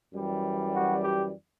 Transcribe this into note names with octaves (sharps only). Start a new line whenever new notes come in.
F#2 E3 G3
F#4
G4